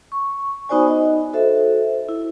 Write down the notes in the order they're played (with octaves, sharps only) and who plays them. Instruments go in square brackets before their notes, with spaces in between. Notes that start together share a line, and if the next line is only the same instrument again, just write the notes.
[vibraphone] C#6
B3 D#4 F#4 C5 D5 G#5
D#4 D#5
F#4 A4 C5 E5
E4